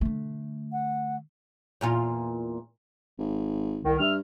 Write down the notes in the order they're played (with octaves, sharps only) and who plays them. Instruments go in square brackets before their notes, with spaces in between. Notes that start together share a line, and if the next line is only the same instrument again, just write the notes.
[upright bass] D3 A3
[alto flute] F#5
[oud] E2 A#2 F4
[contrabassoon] G#1
[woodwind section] C2 D#3
[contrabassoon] G2 [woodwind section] E5 F6